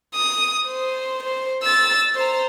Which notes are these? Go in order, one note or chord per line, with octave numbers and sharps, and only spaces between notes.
D#6
C5
C5
E6 A6
C5 A#5